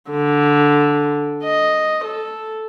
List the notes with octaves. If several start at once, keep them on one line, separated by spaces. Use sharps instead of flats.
D3
D#5
A4